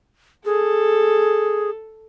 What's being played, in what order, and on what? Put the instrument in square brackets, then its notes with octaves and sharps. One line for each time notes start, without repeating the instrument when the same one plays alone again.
[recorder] G#4 [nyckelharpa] A4